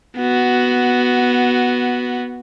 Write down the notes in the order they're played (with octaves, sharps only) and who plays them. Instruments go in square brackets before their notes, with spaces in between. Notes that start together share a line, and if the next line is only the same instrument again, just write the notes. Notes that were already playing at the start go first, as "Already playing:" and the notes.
[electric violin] B3 F#4